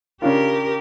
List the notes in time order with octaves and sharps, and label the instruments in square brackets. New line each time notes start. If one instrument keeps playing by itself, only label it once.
[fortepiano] C#3 D4 F4 [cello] G4 A#4